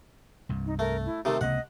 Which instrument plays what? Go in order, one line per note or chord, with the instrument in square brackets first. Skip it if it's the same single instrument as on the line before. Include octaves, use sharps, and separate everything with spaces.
[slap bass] C2 G2
[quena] D#4
[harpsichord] A3 [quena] A#4
[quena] E4
[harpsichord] C3 D#3 A3 [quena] A4
[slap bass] C#2 C3 A#3 [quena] D#5 [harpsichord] F#5